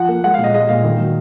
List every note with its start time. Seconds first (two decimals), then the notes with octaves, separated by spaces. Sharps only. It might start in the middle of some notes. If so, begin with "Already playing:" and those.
Already playing: F3 F#5
0.08 A#3
0.24 G#3 F#5
0.34 F5
0.39 A#2
0.44 D#5
0.54 G#3 D#5
0.69 A#2 F5
0.84 D#3
1.00 F#3